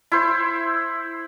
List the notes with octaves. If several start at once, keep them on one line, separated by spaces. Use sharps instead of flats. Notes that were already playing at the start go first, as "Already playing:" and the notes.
E4 C5